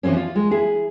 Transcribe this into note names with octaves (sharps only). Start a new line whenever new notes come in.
E3 F3 G3 C4 C#4
F4
G#3
E4 G#4